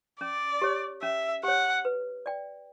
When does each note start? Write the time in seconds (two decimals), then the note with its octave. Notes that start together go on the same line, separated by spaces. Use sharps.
0.21 C#4 D5
0.62 G4 C#5
1.02 C#4 E5
1.43 G4 C#5 F#5
1.85 B4
2.26 D5 G5